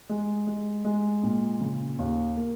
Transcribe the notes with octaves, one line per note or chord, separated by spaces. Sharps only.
G#3
G#3
G#3
A#2
C#3
D#2
A#3